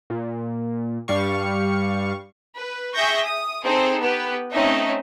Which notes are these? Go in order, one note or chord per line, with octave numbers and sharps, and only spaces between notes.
A#2
G2 G3 F5 C#6
B4
G#4 E5 G5 C#6 G6 A#6
D#6
C4 D#4 G#4 A4 C5
B3 G4 B4
A3 C4 C#4 D#4 D#5 E5